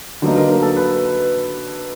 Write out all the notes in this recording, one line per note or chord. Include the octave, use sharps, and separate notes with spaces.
D3 F#3 A#3 D#4 B4
A#4
A#4
A4
B4